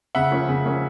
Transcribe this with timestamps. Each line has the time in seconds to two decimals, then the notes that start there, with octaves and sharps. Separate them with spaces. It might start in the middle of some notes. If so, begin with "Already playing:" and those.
0.15 C#3 E5 F#5
0.31 F3 A#3 C#4
0.49 C#3
0.65 F3 A#3 C#4